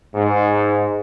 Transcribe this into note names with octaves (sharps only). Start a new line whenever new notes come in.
G#2